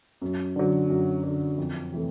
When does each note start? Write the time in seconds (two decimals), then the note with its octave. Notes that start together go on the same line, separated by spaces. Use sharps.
0.22 F#2
0.56 D3 F#3
0.90 F#2
1.24 D3 F#3
1.58 F2
1.92 C3 E3 A3